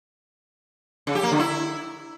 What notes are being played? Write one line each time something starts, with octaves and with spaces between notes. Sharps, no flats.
C#3
G4
A#3
D3
E4